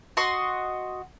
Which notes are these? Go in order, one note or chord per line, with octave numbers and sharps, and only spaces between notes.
F#4 D#5 C6